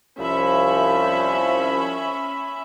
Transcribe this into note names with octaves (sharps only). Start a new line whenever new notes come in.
C2 F3 C#4 E5 B5